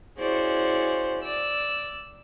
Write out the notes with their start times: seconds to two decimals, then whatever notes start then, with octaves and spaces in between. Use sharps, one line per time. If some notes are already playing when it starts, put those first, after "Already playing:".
0.19 C#4 E4 F#4 G#4 C5 D5
1.23 D5 E6